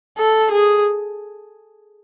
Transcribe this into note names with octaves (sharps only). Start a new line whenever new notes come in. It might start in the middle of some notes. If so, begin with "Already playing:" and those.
A4
G#4